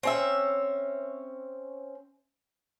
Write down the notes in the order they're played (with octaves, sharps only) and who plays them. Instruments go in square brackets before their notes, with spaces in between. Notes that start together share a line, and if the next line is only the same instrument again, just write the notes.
[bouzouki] C4 C#4 E5